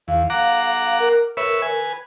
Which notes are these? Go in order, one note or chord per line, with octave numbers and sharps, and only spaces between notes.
E2 F5
F#5 A#5 D6
A#4
B4 C#5 E5
B4 G#5